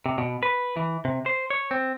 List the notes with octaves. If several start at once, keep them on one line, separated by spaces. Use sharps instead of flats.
C3
B2
B4
E3
C3
C5
C#5
C4